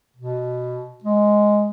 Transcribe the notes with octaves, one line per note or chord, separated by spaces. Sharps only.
B2
G#3